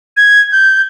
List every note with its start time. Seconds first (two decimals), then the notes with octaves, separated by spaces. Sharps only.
0.17 G#6
0.52 G6